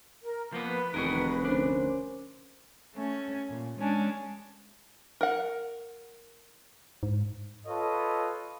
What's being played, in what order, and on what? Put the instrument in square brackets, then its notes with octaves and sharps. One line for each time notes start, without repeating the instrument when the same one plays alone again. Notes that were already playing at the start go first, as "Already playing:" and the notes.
[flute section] A#4
[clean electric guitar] F3 A#3 B3 [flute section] B4
[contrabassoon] F1 [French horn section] E2 D#3 [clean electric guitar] F#4 G#4 A#4
[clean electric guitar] D2 D4 [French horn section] C#4 A#4 C5
[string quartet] A3 C#4
A#2
G#3 C#4 D4
[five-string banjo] A#4 F#5
[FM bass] G#2
[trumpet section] F4 A4 B4 C#5 D#5